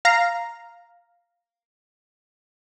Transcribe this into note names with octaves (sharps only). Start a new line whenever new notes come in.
F5 A#5